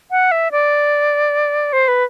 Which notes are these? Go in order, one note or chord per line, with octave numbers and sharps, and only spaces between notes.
F#5
E5
D5
C5
B4